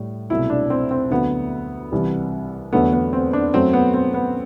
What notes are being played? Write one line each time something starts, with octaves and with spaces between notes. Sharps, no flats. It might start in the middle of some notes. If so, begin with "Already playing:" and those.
Already playing: A2 G3
C2 B2 F#3 A3 E4
D4
C4
C4
D2 D3 F#3 A3 B3
C2 C3 E3 G3
E2 D3 F#3 A3 B3
B3
C4
D4
F#2 F#3 A3 C4
B3
C4
B3